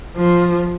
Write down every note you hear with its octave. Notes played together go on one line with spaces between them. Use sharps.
F3